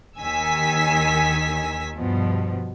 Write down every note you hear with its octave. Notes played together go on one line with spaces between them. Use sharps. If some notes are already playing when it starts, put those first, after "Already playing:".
D#2 D#3 G#5 E6 B6
G2 B2 F3